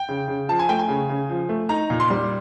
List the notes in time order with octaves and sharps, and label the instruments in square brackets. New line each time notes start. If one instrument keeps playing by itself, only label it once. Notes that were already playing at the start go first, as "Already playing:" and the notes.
Already playing: [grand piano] G5
C#3
C#3
F3 A5
G#5
A3 G5
G#5
C#3
C#3
F3
A3
D#4 A#5
A#2
C6
G3